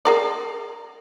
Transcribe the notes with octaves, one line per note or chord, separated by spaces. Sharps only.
G#4 A#4 D5